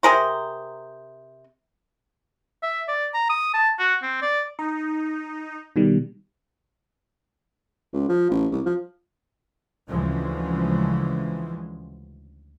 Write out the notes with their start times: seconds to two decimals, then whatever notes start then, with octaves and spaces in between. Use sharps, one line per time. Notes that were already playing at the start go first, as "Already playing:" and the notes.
0.03 C3 G#4 A#4 C5
2.63 E5
2.88 D5
3.14 A#5
3.29 D#6
3.53 A5
3.79 F#4
4.02 C4
4.22 D5
4.59 D#4
5.76 B2 D#3 G3
7.93 C#2
8.09 F3
8.30 A1
8.52 C2
8.66 F3
9.89 D2 C#3 E3 F3 G#3